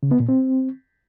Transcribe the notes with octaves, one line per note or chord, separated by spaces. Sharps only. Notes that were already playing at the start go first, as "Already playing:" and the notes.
C#3
B3
A#2
C4